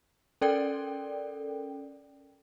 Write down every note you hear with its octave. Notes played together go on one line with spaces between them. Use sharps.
C#4 A4 A#4 D5 G5